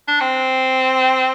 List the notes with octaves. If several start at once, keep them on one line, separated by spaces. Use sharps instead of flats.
D4
C4